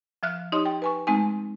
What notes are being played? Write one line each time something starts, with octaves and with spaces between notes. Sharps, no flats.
F3 E5 F6 F#6
D#4 G4 C#5 D#5 C6 D#6
G5
B4 G#5 C#6
G#3 A3 C4 D#4 G#5